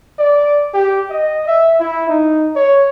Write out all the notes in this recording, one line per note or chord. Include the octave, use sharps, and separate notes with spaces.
D5
G4
D#5
E5
E4
D#4
C#5